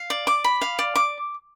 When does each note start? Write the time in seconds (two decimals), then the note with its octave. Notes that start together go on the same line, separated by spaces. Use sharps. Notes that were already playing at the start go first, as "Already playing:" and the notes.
Already playing: F5
0.10 D5
0.27 D6
0.44 B5
0.61 F5
0.79 D5
0.96 D6